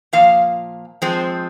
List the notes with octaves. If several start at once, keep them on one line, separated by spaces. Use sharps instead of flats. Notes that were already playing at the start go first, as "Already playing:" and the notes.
A#2 F3 A#3 F5
F3 G#3 C4